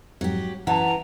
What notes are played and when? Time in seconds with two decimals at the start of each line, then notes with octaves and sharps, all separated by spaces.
0.21 F2 G#2 F#3 G4
0.67 F#2 E3 F#5 A5 A#5